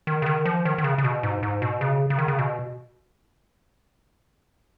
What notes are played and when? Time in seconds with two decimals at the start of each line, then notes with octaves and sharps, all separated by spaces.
0.07 D#3
0.22 C#3
0.26 D#3
0.45 F3
0.65 D#3
0.78 D#3
0.84 C#3
0.98 C#3
1.04 B2
1.23 G#2
1.43 G#2
1.62 B2
1.81 C#3
2.10 C#3
2.18 D#3
2.28 C#3
2.39 B2